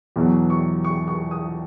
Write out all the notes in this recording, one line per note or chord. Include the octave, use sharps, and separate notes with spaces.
E2 B2 F#3
C#6
C#6
C#6
D#6